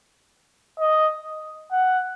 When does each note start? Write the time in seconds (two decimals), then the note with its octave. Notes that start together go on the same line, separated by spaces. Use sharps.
0.80 D#5
1.72 F#5